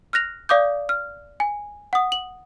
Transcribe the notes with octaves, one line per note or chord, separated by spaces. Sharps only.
F6 F#6 A#6 F7
D5 F5 D6 D#6 G6
F6
G#5
F#5 D#6
F#7